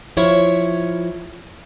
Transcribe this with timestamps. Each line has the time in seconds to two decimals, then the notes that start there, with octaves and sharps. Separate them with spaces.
0.17 F3 E4 C#5